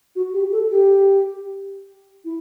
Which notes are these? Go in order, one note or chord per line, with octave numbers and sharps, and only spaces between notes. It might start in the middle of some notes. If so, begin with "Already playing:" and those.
F#4
G4
A4
G4
E4